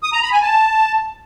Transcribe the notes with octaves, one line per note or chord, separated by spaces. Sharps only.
D#6
A#5
B5
G#5
A5